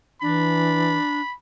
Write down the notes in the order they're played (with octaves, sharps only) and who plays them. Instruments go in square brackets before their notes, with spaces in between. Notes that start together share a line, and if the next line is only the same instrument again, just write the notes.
[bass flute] E3 [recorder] D4 [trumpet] B5